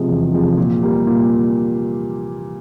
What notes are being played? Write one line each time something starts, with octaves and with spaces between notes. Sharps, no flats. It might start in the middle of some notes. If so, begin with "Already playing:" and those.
Already playing: C3 F3 G#3 C4
E2
C3 F3 G#3 C4
A#2
G3 A#3
A#2